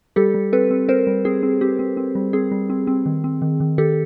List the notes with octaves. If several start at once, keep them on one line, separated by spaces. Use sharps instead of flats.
G3 G4 A4
G3
C4 A4 B4
C4
C4 A#4 C5
G3
C4 G#4
C4
C4 G4
C4
C4
G3
C4 G#4
G3
C4
C4
D#3
C4
D#3
D#3
D#3 G4 A4